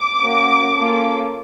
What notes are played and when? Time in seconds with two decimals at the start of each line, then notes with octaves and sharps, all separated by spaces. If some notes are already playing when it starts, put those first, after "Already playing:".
Already playing: D6
0.19 A#3 C#4 F#4
0.75 A#3 C#4 F4 A4